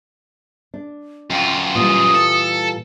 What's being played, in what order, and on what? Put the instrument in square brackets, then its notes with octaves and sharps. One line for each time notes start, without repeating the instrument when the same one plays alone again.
[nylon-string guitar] D4
[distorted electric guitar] F#2 F4 [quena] G5
[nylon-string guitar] A#2 E3 G3 [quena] D#6
[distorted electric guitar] A4